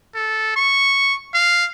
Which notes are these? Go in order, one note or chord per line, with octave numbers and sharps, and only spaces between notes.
A4
C#6
F5